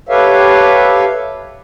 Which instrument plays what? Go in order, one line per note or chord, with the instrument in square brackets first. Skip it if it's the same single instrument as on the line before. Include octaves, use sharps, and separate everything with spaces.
[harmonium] G4 A4 B4 C#5 E5 F5